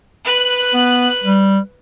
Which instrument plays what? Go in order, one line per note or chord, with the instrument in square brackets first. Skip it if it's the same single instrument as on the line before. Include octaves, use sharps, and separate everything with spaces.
[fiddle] B4 F#6
[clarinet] B3
G3